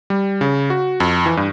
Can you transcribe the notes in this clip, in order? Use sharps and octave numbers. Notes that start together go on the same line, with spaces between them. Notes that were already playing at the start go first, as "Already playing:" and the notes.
G3
C#3
F#4
F2
E3
G2